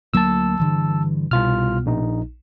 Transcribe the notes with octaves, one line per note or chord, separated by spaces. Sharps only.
D2 F#3 A#3 A5 E6
G2 D3 E3
C2 B2 F4 F6
A#1 D#4